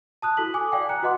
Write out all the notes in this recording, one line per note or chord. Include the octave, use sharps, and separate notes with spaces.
A5 D#6 F#6
E4 F#4 A4 B6 F#7
G#5 D6 D#6
D5 F5 G5
A#5 F#6 C#7
F#4 B4 D#5 F#5 C6 D6